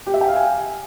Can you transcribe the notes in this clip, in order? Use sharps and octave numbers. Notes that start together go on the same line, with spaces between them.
G4
E5
G5
F5
G#5